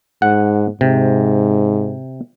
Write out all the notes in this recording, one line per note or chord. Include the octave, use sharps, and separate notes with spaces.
G#2 F#5
G#2 C3